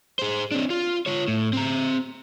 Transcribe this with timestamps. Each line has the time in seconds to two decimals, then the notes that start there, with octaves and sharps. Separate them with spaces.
0.19 G#4 C5
0.51 C4 D4
0.70 F4
1.06 F4 C#5
1.28 A2
1.53 C4 A#5